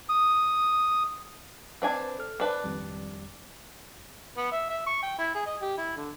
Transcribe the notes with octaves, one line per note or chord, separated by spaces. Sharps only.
D#6
C4 D4 B4 G#5
A4 F6
D4 B4 C5 A5
G#1 F2 G3
B3
E5
E5
C#6
G5
E4
G#4
D#5
G4
E4
D3